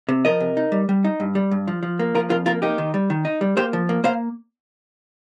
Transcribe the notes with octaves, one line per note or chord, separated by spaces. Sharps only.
C3
F3 A#4 D#5
C3
D#4
G3
G3
D#4
G2
G3
G2
F3
F3
A#3
F3 F4 A#4
F2 F4 A#4
A#3 F4 A#4
A#3 D#4 G4
D#3
G3
D#3
D#4
G3
A#3 G4 C5
F3
A#3
A#3 C5 F5